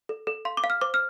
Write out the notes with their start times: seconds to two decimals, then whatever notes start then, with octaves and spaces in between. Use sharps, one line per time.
0.09 A4
0.27 A4
0.45 F5 C6
0.57 D6
0.64 F5
0.70 F6
0.81 C5 D6
0.94 F6